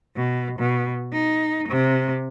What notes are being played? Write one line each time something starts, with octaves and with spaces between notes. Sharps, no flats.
B2
B2
D#4
C3